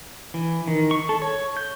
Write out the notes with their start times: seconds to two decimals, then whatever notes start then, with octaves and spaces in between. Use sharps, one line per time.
0.34 E3
0.68 D#3
0.91 C#6
1.09 A4
1.22 C#5
1.57 G6